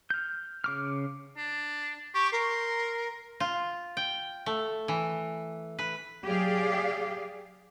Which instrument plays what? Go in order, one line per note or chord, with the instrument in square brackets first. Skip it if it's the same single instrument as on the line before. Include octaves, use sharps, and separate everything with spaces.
[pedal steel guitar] F6 G6
C#3 D6 F6
[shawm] D4
[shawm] G4 [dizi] C#6
[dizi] A#4 [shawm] C6
[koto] F4
G5
A3
E3
B4
[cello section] F#3 G4 G#4 D5 F5